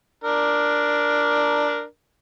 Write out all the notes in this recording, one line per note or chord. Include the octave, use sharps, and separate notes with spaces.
D4 A#4